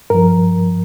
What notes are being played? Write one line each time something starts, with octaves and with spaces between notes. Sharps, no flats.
G2 F3 A#4